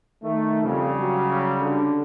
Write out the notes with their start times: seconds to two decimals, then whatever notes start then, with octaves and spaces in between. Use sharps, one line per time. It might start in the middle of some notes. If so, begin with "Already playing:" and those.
0.23 D#3 A3
0.63 F2 C#3 G3
1.00 F#3
1.61 D3